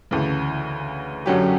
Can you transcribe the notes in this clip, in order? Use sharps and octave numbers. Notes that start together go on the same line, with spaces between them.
D2 C#3 E3
F#2 D3 F#3 C#4 G4